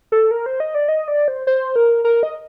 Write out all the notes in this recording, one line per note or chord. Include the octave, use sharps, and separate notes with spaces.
A4
A#4
C5
D#5
D5
D#5
D5
C5
C5
A#4
A#4
D#5